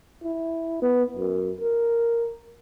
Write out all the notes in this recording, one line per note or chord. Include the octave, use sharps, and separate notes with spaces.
E4
B3
F#2
A#4